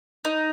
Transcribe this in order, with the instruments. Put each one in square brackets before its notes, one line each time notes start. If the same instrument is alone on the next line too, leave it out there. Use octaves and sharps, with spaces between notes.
[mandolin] D#4